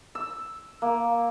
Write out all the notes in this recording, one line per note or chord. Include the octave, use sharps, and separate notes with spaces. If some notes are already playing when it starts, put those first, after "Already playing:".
E6
A#3